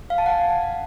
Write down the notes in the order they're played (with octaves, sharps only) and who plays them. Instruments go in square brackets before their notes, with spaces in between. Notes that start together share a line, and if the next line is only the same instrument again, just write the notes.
[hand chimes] F5
A5
F#5
G#5